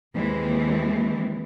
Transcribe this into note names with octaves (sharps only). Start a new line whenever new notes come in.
D#2 E3 G#3 C4